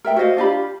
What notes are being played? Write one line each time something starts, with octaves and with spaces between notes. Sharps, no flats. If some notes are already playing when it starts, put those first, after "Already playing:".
A#4 E5 G5
F#4 C5 D#5 F5
D4 F4 G4 B5